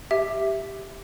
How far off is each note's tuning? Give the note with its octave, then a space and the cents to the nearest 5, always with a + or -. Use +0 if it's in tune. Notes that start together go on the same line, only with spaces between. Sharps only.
G4 +0 E5 +0